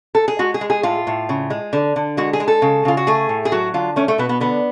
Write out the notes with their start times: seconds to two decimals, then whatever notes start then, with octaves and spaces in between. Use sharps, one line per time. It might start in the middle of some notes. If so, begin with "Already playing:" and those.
0.15 A4
0.28 G#4
0.39 G#3 F#4
0.54 G#4
0.61 G#3
0.70 G#4
0.83 A2 F4
1.07 A2
1.29 C#3
1.50 G#3
1.73 D3
1.96 D3
2.17 G#3 F#4
2.33 G#4
2.40 G#3
2.48 A4
2.62 C#3
2.85 C#3 F4
2.97 F#4
3.07 A3 G#4
3.29 A2
3.45 G#4
3.52 F#3 F#4
3.74 D3 F4
3.96 A3 C#4
4.08 A3
4.18 B2 B3
4.29 B3
4.40 D3 B3